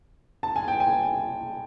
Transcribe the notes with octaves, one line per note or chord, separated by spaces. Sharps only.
A5
G#5
G5
G#5